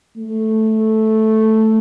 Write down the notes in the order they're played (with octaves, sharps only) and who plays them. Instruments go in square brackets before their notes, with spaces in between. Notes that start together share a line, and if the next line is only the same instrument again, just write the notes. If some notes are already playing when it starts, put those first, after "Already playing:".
[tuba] A3